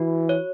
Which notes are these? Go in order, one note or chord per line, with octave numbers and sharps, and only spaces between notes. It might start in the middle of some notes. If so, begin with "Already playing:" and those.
Already playing: E3 F#4
C#5